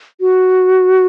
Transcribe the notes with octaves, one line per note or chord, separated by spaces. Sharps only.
F#4